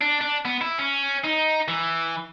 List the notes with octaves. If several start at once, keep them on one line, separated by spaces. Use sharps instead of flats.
D4
D4
B3
E4
C#4
D#4
E3